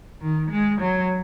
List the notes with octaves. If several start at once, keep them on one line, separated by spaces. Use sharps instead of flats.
D#3
G#3
F#3